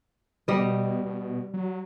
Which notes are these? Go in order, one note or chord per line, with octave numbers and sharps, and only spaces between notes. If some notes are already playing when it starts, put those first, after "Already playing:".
B2 G3 D#5
B2
F#3